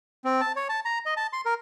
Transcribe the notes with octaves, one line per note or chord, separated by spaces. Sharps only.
C4
A5
C#5
A5
A#5
D#5
A5
C6
A#4